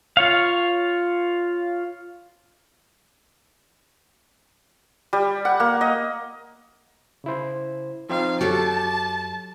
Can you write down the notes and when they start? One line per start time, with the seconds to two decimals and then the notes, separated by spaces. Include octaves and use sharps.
0.17 F4 C#5 F5
5.13 G3
5.45 F#5
5.60 A#3
5.81 D#5
7.24 C#3 E4 C5
8.09 F3 C4 D#4 F5
8.41 F#2 F#3 F#4 G4 A4 A5